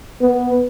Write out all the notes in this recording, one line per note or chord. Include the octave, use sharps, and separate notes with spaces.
B3